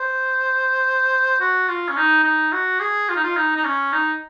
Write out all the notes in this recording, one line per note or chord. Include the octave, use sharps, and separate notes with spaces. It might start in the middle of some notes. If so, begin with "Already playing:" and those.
Already playing: C5
F#4
F4
C#4
D#4
D#4
F#4
G#4
F4
D#4
F4
D#4
D#4
C#4
D#4